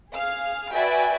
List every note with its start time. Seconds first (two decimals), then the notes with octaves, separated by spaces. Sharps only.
0.12 G#4 F5 F6
0.72 F#4 B4 D5 E5 G5 G#5